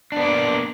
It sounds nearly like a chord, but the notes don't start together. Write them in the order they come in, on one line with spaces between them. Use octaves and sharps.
D4 B3 D5 A#3